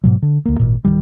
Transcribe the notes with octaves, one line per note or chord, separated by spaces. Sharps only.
G#2 B2 F#3
D3
D2 A#3
G#1 A#2
D1 D#2 D#3 G3